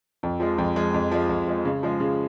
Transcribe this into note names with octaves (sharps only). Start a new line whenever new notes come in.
F2
F3 G#3
F2
F3 G#3
F2
F3 G#3
F2
F3 G#3
C#3
F3 G#3
C#3